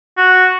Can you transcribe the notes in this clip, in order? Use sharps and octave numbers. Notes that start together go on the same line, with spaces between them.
F#4